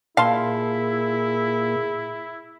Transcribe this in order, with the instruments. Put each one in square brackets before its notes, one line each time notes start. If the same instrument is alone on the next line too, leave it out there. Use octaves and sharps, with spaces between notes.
[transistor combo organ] A#2 [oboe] E4 [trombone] G#4 [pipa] F5 A5 C6